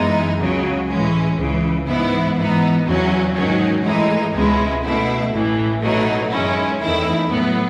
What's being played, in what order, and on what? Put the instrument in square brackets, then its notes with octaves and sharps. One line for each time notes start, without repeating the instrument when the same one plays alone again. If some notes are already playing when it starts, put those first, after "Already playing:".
Already playing: [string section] F#2 E3 G#3 B3 D#4
C#2 C#3 F#3
A2 E3 G#3 C#4
C#2 C#3 E3
G#2 E3 B3 E4
G#2 E3 B3 D#4
E2 C#3 F#3 C#4
G#2 D#3 F#3 C#4
A2 E3 G#3 D#4
C#2 B2 G#3 C#4 E4
B2 A3 E4
A1 A2 E3
B2 F#3 A3 D#4
F#2 D#3 G#3 C#4 E4
E2 D#3 A3 E4
A2 F#3 B3